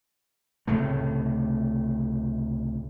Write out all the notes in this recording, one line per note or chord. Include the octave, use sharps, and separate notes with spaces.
C#2 A2 C3 A3